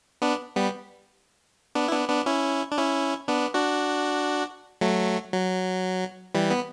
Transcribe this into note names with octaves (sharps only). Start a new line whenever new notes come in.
B3 D4
G3 B3
B3 D4
E4
B3 D4
B3 D4
C#4 E4
D4
C#4 E4
B3 D4
D4 F#4
F#3 A3
F#3
E3 G3
B3